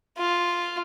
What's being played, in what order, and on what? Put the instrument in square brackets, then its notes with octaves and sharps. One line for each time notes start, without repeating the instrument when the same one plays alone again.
[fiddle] F4